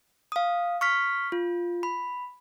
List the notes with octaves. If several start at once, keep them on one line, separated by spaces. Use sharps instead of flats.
F5 D#6
C#6 F6 B6
F4
B5